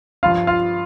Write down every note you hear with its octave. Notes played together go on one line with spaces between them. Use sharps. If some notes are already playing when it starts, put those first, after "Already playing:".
G2 F3 F4 F5
F4 F5